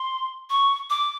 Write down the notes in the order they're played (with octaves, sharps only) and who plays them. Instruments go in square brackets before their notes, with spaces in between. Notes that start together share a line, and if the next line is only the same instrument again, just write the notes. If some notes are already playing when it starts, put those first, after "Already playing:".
Already playing: [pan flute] C6
C#6
D6